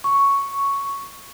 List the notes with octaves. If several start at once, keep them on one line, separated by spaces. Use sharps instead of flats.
C#6